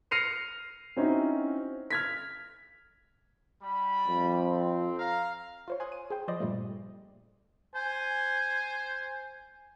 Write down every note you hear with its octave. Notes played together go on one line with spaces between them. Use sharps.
F6 A#6 C7 C#7 D#7 F7
C4 C#4 D#4 E4 F#4
F6 G#6 B6
G3 B5
F2
C4
F5 A#5
F4 C5 C#5
G#5 C6 D#6 F#6
D#7
G#4 C5 G5
F3 B4 C5 D5 D#5
G2 A#2 G3 A3
C5 G#5